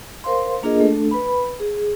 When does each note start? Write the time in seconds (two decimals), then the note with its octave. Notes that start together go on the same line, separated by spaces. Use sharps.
0.24 A#4 C5 F5 C6
0.63 A#3 D4 F4 G#4 A#4 D#5
0.80 A3 D4 A4
1.11 B4 B5
1.60 G#4